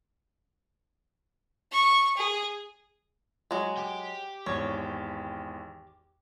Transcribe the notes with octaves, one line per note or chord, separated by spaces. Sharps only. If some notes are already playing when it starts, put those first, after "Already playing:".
C#6
G#4
F#3 G#3
G4
G#1 E2 C#5